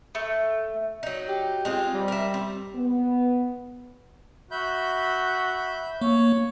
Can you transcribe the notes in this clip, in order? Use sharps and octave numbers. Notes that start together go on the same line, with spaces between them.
A3
F#3 D#4
G4
G#3 C4 F4
G3
A#4 E5
C4
B3
F#4 E5 B5 G6
A#3 C#5